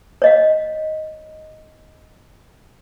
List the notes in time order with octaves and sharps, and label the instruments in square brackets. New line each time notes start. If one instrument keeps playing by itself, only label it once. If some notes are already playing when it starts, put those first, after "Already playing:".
[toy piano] C#5 D#5 F5